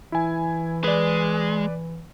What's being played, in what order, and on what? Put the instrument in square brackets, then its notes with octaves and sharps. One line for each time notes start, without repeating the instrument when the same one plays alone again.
[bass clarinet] E3 [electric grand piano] E4 G#5
[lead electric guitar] G#3 [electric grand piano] B4 D5